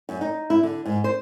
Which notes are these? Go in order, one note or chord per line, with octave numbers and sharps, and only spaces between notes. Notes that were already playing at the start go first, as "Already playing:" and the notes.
F#2
D#4
E4
D3
G#2
C5